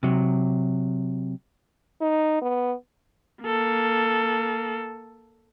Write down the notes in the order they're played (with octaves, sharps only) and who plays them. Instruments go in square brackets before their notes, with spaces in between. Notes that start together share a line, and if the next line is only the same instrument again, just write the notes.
[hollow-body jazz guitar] C3 F#3
[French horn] D#4
B3
[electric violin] A#3 A4